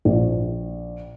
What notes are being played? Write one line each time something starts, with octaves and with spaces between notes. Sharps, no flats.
A#1